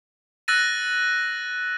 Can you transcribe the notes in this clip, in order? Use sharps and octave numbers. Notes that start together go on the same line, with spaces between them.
E6 F#6 A6 A#6 D#7